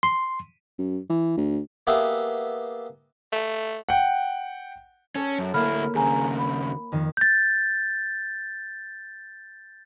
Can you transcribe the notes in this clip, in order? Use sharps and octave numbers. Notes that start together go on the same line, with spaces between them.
C6
F#2
E3
D2
A#3 B3 G4 G#4 B4 E5
A3
F#5 G5
C#4 A4 C#5
F#2
D2 A#3 E4 A4 B5 F6
D#2 C#3 G#4 G#5 A#5
B5
F2 D#3
G6 A6